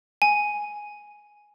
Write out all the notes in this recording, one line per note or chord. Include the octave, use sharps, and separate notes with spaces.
G#5